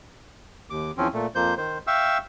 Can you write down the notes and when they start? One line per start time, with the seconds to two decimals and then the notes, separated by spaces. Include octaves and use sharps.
0.70 D#2 D6
0.98 E2 F3 C4 C#4
1.14 A#2 A3
1.35 F2 A#3 C5 G6
1.57 D#3 C5
1.87 E5 F5 G5 C#6 E6